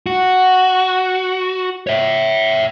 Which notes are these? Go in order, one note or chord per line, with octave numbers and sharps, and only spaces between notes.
F#4
C#5 E5